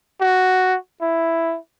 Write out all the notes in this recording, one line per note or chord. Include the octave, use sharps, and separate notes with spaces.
F#4
E4